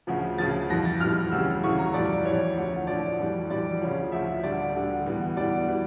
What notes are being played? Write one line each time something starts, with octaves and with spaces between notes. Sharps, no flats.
D2 C#3 F3
D2 C#3 F3 A6
F2 E3 G3 A#6
A6
F2 E3 G3 F6
D2 C#3 E3 G3 E6
D2 C#3 E3 G3 C#6
A#5
F2 E3 G3 D5
F2 E3 G3 C#5
D2 D3 F3
D2 D3 F3 D5
F2 E3 G3
F2 E3 G3 D5
D2 C#3 F3 C#5
D2 C#3 F3 E5
D2 D3 G3 D5
D2 D3 G3
E2 E3 G3
E2 E3 G3 D5
E3 G3